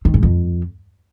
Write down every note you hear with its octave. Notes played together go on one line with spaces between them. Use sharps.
D#3
G#2
F2